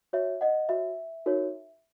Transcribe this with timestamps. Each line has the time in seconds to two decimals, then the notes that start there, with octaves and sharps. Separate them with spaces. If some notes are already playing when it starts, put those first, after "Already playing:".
0.13 F#4 C#5 E5
0.41 D#5 F#5
0.69 F#4 C#5 E5
1.26 D#4 F#4 A#4 C#5